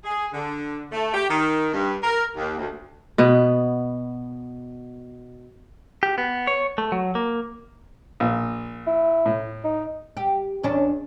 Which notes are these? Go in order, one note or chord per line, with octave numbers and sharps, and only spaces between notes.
G#4
D3
A3
G4
D#3
G2
A#4
D#2
D2
B2 B3
G4
B3
C#5
A3
F#3
A#3
A#1
E4
A2
D#4
G4
E2 C#4 D4